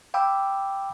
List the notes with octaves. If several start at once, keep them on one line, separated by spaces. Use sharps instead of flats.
F5 G5 B5 D6 E6